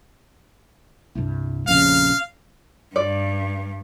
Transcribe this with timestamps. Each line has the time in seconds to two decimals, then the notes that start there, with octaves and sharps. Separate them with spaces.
1.15 C2 G2
1.67 A#1 F2 C#3 F5
2.96 G2 D5